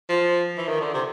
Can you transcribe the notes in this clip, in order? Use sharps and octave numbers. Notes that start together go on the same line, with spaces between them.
F3
E3
D#3
D3
C3